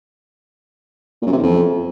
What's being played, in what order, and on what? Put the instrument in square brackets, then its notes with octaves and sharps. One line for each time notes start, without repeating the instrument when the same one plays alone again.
[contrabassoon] A#2
F#2
C3
E2
F2